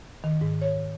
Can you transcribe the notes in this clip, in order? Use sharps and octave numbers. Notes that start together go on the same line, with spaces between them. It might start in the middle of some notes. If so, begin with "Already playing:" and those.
D#3
G#2
C#5